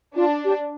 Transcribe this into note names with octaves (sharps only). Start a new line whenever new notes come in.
D4 F4
G4